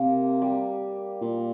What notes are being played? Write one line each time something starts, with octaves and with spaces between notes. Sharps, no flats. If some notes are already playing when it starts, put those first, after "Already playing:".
Already playing: C3 A#3
G3
A#2